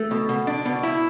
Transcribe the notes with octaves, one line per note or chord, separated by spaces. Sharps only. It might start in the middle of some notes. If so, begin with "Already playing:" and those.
Already playing: A3
B2
B2
D4
B2
E4